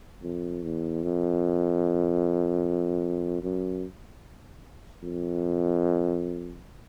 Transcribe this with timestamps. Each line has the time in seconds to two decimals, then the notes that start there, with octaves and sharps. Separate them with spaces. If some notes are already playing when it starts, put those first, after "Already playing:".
0.23 F2
0.63 E2
1.03 F2
3.43 F#2
5.03 F2